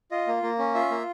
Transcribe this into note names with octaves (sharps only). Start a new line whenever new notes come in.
F4 D#5
A#3
A#3
C#4
F4 E5
A#3